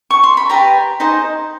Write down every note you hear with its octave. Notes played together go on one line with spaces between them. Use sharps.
C#6
C6
B5
G4 B4 D5 A#5
D#4 G#4 C5 D#5